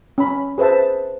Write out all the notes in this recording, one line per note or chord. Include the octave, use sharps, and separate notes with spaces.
C#4 B5
G#4 B4 C5 E5 A5